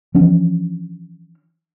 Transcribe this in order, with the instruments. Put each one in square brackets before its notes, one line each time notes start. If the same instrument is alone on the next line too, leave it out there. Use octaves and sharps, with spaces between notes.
[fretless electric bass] E3 F3 C#4 D4